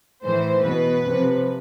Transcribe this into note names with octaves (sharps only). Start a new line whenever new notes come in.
A2 E3 C5
B2 B4
C3 F3